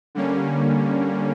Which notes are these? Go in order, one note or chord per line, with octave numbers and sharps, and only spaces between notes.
D3 G3 A#3 C#4